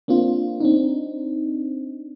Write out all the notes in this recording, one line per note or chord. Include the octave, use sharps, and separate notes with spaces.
A#3 C4 D4 F4
C4 D4 D#4